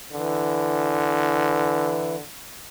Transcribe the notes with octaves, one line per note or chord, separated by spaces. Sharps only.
D3 E3